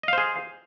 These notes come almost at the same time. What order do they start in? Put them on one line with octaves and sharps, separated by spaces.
D#5 F5 C5 G#4